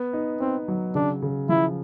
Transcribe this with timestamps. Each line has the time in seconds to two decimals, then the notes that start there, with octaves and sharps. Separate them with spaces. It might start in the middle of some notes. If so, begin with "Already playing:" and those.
Already playing: B3
0.13 D#4
0.40 C4 D#4
0.68 F#3
0.95 C#3 D4
1.22 C#3
1.49 F3 E4